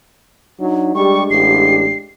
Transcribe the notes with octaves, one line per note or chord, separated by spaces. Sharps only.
F#3 D4 D#4
G3 G#3 D4 G4 C#6
A1 C7